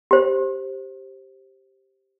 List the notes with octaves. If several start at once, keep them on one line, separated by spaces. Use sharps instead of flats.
G4 C5